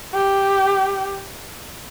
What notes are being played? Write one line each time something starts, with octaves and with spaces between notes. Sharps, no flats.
G4